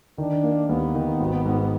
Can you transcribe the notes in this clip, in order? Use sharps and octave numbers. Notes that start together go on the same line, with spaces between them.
D#3 D4
A#3
D#2 B3
D#3
G#1
G#2